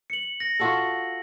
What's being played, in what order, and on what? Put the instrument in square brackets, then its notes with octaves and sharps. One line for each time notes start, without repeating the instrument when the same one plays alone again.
[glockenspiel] C#7 F#7
A#6
[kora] F4 F#4 A4